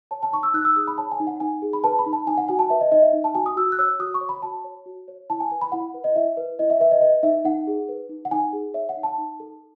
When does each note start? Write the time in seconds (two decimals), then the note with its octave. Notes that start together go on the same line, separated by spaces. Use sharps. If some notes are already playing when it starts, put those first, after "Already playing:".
0.11 C#5 A5
0.23 A5
0.33 D#4 C#6
0.43 E6
0.54 D#4 F#6
0.65 E6
0.76 G#4 D#6
0.87 B5
0.98 C#5 A5
1.12 G#5
1.20 D#4
1.27 F#5
1.40 D#4 G#5
1.62 G#4
1.73 B5
1.84 B4 A5
1.99 B5
2.06 D#4
2.13 A5
2.27 D#4 G#5
2.37 F#5
2.48 F#4 G#5
2.59 A5
2.70 B4 E5
2.81 D#5
2.92 D#4 D#5
3.02 E5
3.13 D#4
3.24 A5
3.35 F#4 G#5
3.46 D#6
3.56 F#4 E6
3.72 F#6
3.79 C#5 E6
3.99 F#4 D#6
4.14 C#6
4.21 C#5
4.29 B5
4.42 F#4 A5
4.64 C#5
4.86 F#4
5.08 C#5
5.30 E4 A5
5.40 G#5
5.51 B4 G#5
5.61 B5
5.72 E4 F#5
5.94 B4
6.04 D#5
6.15 E4 E5
6.37 B4
6.59 E4 D#5
6.70 E5
6.80 B4 E5
6.91 D#5
7.01 B4 D#5
7.23 D#4 E5
7.45 D#4 F#5
7.67 G#4
7.89 B4
8.09 D#4
8.25 F#5
8.31 D#4 G#5
8.53 G#4
8.74 C#5 E5
8.89 F#5
8.97 D#4
9.03 A5
9.18 D#4
9.40 A4